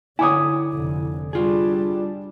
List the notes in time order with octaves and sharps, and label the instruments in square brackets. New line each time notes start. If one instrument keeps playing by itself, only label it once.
[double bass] D3 [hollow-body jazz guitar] E4 C#5 [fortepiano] G#5 D6 D#6
[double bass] F1 D3
[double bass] G3 D4 [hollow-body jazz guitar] F4 G#4